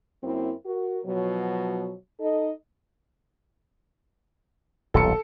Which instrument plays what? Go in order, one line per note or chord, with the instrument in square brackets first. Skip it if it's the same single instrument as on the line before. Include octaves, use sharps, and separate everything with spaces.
[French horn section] F#2 A#3 C4 E4
F#4 A#4
B2 F3 F#3
D#4 A4 D#5
[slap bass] D#1 B1 [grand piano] A4 C#7